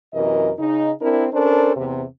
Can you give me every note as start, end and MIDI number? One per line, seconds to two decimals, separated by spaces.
0.13 0.51 42
0.13 0.51 48
0.13 0.51 52
0.13 0.51 70
0.13 0.51 75
0.58 0.91 49
0.58 0.91 61
0.58 0.91 63
1.02 1.27 60
1.02 1.27 62
1.02 1.27 64
1.02 1.27 70
1.32 1.74 61
1.32 1.74 62
1.32 1.74 69
1.32 1.74 70
1.32 1.74 72
1.75 2.03 40
1.75 2.03 48